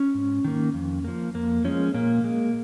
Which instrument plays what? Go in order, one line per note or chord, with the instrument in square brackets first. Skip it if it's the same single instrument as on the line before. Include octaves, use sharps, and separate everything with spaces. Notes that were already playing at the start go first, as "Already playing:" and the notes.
Already playing: [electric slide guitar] C#4
G#2
D#3 A#3
F2
F3 A#3
F2 A#3
F3 G#3 C#4
A#2 A#3
G#3